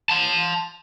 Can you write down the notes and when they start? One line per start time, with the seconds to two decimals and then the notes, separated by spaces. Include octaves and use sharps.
0.10 A5 C6